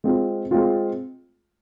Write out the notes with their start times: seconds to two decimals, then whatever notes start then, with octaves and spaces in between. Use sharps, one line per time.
0.04 G#3 C4 F4
0.51 G#3 C4 F4